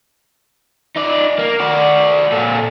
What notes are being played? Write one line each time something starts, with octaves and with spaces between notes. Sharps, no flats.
D#4 D5
A#3
F#4 D5
A#2 A4